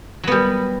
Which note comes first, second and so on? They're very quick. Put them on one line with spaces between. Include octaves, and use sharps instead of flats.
F#3 B3 G3